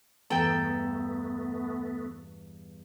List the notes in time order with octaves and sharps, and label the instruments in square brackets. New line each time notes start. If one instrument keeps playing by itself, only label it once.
[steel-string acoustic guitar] E2 G2 A#5 [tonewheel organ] A3 B3 [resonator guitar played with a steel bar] A4 G5